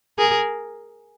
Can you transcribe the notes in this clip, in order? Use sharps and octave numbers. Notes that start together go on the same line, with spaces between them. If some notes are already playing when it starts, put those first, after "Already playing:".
G#4 A#4